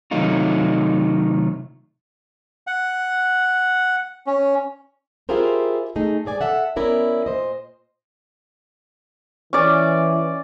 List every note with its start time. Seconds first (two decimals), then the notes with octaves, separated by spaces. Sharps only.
0.11 C3 D#3 F#3 A3 D#4 F4
2.67 F#5
4.27 C#4
5.29 E4 F4 G4 G#4 A#4 C5
5.96 A3 D#4 G#4
6.25 G2 G#4 D5 G#5
6.41 A4 E5 F#5
6.76 B3 C#4 E4 A#4 D5
7.26 A#2 C5 D#5
9.53 E3 C#4 D5